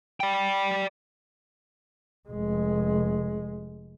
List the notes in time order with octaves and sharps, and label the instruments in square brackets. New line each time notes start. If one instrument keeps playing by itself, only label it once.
[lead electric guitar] D5 G5
[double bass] F1 G#3